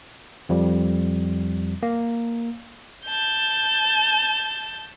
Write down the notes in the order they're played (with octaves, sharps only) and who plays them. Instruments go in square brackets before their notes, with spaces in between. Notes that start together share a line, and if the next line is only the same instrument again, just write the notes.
[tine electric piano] F2 F3 G3
A#3
[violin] A5 G6